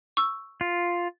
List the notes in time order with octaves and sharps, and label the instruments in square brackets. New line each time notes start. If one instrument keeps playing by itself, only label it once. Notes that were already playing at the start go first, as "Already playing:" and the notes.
[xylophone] C#6 E6
[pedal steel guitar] F4